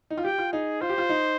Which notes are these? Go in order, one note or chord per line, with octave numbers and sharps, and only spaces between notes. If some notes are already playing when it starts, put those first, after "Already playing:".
D#4
F4
G4 G5
F4
D#4 G#4
F4 C5
G4
F4
D#4